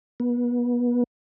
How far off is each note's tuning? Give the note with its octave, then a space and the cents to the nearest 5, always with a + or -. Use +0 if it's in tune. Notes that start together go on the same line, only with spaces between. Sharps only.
B3 -30